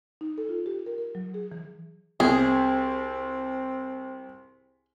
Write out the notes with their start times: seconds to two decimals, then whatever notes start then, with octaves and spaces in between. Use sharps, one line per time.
0.21 D#4
0.38 A4
0.49 F4
0.66 G4
0.86 A#4
0.98 A#4
1.15 F#3
1.34 G#4
1.52 E3
2.20 C2 C4 G#4